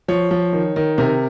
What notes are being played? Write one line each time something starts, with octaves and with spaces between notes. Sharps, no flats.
F3 C#5
F3
D#3
D#3
C3 A#4